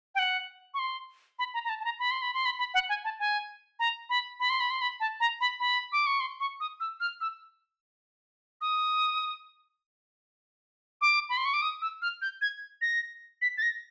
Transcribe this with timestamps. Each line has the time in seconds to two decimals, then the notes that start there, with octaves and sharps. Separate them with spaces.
0.15 G5
0.19 F#5
0.74 C#6
0.79 C6
1.39 B5
1.54 A#5
1.65 A#5
1.69 A5
1.80 A5
1.85 A#5
1.99 B5
2.11 C6
2.22 B5
2.34 C6
2.46 B5
2.59 B5
2.74 F#5
2.89 G#5
3.04 A5
3.19 G#5
3.79 A#5
4.10 B5
4.40 B5
4.50 C6
4.60 B5
4.71 C6
4.81 B5
5.00 A5
5.20 A#5
5.41 B5
5.60 B5
5.92 D6
6.06 C#6
6.20 C6
6.40 C#6
6.60 D#6
6.80 E6
7.00 F6
7.21 E6
8.61 D#6
11.01 D6
11.29 B5
11.37 C6
11.45 C#6
11.54 D6
11.62 D#6
11.82 E6
12.02 F6
12.22 G6
12.42 G#6
12.82 A#6
13.42 B6
13.58 A6
13.62 A#6